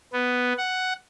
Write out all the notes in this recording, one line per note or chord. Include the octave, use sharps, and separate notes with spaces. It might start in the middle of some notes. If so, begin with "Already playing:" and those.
B3
F#5